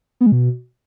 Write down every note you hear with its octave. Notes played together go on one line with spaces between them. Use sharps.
B3
G#3
B2